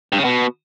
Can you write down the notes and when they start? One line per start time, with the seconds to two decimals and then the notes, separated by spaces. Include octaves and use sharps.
0.12 G2
0.18 C#3
0.25 B2